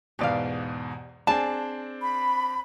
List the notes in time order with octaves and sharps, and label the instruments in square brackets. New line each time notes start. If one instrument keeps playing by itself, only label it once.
[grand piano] E2 G#2 B2 [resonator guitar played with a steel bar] G4 D5 F5
[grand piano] C4 D4 [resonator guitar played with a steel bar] G#4 [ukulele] A5
[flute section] B5